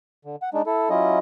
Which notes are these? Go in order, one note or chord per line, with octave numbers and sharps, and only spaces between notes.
D3
F#5
G#3 D4 D#4
E4 A4
F#3 C#4 E4 F4 D#5